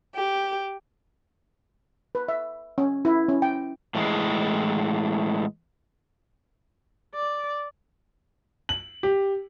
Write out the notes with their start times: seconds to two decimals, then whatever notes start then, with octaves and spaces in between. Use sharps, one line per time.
0.15 G4
2.15 B4
2.28 E5
2.78 C#4
3.05 E4
3.29 C#4
3.42 G5
3.95 A2 E3 G3 G#3
7.15 D5
8.69 F#7
9.03 G4